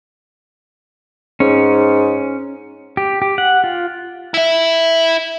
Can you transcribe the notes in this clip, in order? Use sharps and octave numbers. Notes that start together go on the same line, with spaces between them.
G#2 C#4
G4
G4
F#5
F4
E4 E5